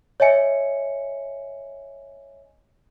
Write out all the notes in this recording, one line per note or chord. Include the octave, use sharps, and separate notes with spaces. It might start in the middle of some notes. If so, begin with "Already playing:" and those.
C#5 D#5 E5 G#5 C#7